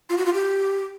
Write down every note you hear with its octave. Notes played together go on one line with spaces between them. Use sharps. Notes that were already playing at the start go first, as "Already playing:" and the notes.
F4
F#4
F4
G4